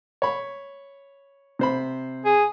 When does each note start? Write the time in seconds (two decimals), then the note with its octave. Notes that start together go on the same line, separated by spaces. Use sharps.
0.22 C#5 B5
1.59 C3 C5 B5
2.25 G#4